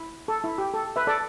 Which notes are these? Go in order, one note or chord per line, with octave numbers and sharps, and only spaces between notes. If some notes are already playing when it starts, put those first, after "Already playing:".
Already playing: E4
A4
E4
G4
A4
B4 E5
A4 D5